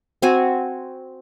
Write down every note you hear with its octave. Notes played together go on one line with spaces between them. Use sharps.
C4 F#4 G#5